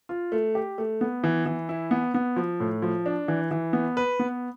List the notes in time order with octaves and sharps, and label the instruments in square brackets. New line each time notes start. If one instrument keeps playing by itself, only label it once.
[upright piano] F4
A3
G4
A3
B3
E3
E3
E4
B3
B3
F3
A2
F3
D4
E3
E3
B3
B4
B3